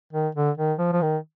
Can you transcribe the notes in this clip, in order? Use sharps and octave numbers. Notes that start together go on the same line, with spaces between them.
D#3
D3
D#3
F3
F3
D#3